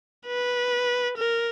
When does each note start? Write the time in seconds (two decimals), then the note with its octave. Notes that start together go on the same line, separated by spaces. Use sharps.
0.27 B4
1.18 A#4